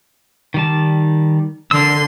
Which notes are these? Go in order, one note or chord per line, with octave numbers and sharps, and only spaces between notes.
D#3 G3 A5
D3 A#4 C6 E6